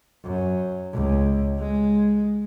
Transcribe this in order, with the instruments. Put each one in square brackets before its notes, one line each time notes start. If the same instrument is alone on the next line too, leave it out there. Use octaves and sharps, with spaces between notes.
[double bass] F#2
C#2
G#3